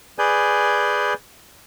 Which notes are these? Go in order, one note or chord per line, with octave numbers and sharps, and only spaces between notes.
G#4 B4 D5 G#5 G6